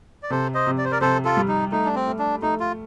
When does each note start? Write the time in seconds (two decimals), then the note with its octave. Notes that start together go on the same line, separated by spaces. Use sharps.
0.23 D5
0.30 C3 A4 C5
0.54 C5 D#5
0.67 C3
0.78 D5
0.85 C5
0.92 A#4 D5
1.01 C3 A4 C5
1.25 F4 A4
1.37 G3
1.48 D#4
1.72 A3 D#4
1.85 D4
1.95 C4
2.07 A3
2.19 D4
2.42 A3 D#4
2.60 F4